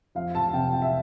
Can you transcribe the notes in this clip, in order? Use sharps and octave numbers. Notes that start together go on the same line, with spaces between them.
F2 F5
A5
C3 G5
G5
E5